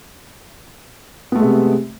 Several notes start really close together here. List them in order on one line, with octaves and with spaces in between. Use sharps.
B3 A3 G#3 C3